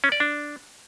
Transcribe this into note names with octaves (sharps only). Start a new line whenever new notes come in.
C#4
D5
D4